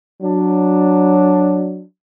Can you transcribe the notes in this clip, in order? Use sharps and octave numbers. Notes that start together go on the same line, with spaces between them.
F#3 D4